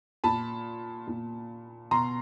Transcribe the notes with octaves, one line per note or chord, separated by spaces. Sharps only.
A#2 A5 B5
A#2
B2 A#5 C6